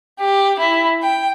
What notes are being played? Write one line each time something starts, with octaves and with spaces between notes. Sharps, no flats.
G4
E4
G5